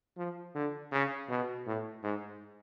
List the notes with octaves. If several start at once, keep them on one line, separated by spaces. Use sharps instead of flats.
F3
D3
C#3
B2
A2
G#2